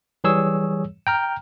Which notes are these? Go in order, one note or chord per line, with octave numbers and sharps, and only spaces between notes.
E3 G3 G#4 C#5 E6
G5 A#5 F6